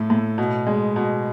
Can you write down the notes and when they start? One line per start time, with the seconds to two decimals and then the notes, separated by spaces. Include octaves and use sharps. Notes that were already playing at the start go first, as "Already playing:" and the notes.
Already playing: A2 A3
0.10 A2
0.38 B2
0.67 G#3
0.96 B2